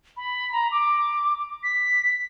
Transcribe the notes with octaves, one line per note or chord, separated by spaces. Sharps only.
B5
A#5
D6
B6